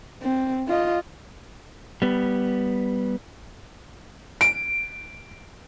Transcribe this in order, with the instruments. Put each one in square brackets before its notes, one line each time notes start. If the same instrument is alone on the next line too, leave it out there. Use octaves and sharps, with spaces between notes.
[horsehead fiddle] C4
F4 D#5
[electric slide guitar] G3 B3
[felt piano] D7